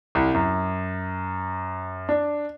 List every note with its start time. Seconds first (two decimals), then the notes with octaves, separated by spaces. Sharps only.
0.15 C2
0.34 F#2
2.09 D4